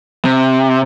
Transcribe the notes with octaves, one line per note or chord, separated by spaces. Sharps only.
C3